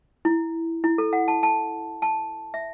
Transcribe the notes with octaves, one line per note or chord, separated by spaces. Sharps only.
E4
E4
A4
F#5
A5
A5
A5
E5